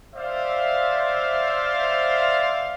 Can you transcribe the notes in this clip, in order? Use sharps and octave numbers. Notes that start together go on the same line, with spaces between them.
C5 D5 E5 F5